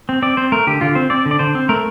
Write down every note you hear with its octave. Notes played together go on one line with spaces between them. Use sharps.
C4
C4 D5
C4 C5
A3 A#4
D3 G4
D3 F4
C4 C5
C4 D5
D3
D5
D3 C5
C4
A3 A#4